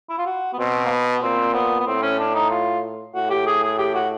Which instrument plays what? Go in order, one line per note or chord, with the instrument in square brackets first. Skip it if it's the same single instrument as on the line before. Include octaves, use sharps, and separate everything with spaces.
[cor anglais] E4
F4
F#4
B3
[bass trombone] B2 [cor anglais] C4
[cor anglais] A#3
B3
[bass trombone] A#2 [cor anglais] C4
[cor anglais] B3
B3
[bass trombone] A2 [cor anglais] C4
[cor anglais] C#4
D4
D#4
F4
[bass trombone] A2 [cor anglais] F#4
[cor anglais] G4
G#4
G#4
G4
F#4